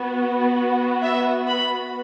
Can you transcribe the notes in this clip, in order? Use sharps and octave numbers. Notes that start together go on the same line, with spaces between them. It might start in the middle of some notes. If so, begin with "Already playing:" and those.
Already playing: B3 F#4
E5
B5